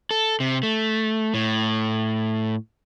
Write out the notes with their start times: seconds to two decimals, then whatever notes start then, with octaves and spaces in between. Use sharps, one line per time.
0.11 A4
0.40 C3
0.63 A3
1.34 A2